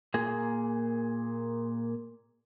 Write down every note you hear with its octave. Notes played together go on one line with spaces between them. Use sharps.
A#2 A#3 G#4